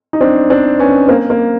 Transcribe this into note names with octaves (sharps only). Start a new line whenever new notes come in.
D#4
C4 D4
C4 D4
B3 C#4
A#3 C4
A#3